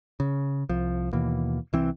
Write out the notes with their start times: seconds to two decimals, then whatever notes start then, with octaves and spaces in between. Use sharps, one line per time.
0.20 C#3
0.69 C2 F3
1.13 D#2 B2 E3 A#3
1.73 C2 E3 C4